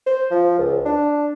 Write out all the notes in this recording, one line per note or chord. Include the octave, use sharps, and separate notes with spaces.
C5
F3
C#2
D4